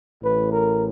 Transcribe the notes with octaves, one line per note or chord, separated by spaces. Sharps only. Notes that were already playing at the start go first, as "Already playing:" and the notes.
A1 A2 E3 B4
A#4